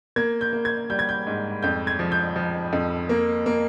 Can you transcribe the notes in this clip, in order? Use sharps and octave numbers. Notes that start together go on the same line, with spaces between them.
A#3 G#6
G6
A#3
G#6
G3 G6
G#6
G6
G#2
F2 G6
G#6
F3
G6
F3
F2
A#3
A#3